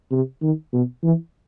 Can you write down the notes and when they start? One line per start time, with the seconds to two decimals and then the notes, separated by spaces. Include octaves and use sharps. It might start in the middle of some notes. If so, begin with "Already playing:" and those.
0.11 C3
0.42 D#3
0.73 B2
1.04 E3